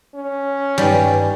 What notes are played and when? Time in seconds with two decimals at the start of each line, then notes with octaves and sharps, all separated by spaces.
0.15 C#4
0.78 G2 D#3 G3 B4 D5 G#5